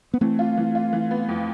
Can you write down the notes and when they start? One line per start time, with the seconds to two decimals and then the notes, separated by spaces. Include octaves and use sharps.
0.14 B3
0.21 E3 A3 C4
0.39 F4
0.57 E3
0.75 F4
0.93 E3
1.11 B3
1.29 F2